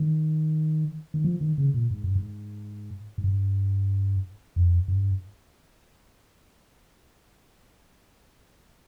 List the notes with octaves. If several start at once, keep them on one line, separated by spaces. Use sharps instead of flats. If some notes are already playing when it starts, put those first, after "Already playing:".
Already playing: D#3
D#3
F3
D#3
C#3
A#2
G#2
G2
G#2
G#2
G2
F2
G2